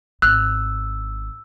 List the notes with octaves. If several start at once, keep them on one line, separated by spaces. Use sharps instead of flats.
G#1 E6 F#6